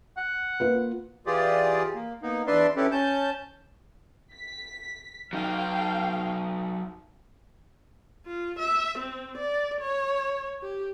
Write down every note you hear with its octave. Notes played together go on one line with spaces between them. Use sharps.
F#5
A#3 F4 B4
E3 F4 G4 G#4 D5
A#3
A#3 B3 D#4
E2 D4 B4 D5 E5 C6
C#4 E4 G4 A4 B4
C#4 A5 G6
B6
F#3 D#4 F5 G5
F4
E5
C4
D5
C#5
G4